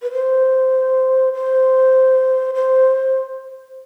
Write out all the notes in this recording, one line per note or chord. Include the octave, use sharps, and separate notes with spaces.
B4
C5
C5
C5